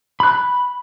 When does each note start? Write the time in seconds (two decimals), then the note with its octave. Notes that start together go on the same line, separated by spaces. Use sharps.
0.20 B5 F#6